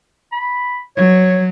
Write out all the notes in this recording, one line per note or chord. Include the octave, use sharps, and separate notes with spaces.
B5
F#3 C#5